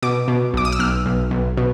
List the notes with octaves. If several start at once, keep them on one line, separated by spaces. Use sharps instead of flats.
B2 D6
B2
B1 D6
D#6
E6
B1 F6
B1
B1
B2